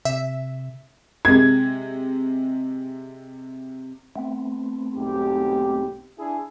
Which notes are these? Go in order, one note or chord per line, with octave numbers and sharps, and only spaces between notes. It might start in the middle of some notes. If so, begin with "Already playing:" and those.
C3 E5
C3 G#3 G#6
A3 B3 C4
B1 G#2 G4
D4 E4 G#4